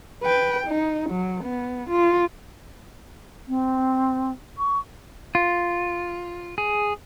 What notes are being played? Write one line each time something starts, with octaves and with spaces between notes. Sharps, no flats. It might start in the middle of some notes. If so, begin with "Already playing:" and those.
B4 G5
D#4
F#3
B3
F4
C4
C#6
F4
G#4